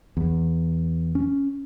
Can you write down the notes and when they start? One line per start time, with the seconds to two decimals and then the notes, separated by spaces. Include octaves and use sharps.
0.17 E2
1.15 C#4